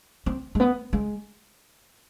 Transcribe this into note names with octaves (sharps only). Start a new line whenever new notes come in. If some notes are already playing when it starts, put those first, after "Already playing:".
C4
G#3
B3
G#3